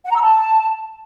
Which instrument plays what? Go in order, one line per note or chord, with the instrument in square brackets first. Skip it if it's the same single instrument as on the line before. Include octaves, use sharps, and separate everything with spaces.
[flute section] F#5
A#5
E6
A5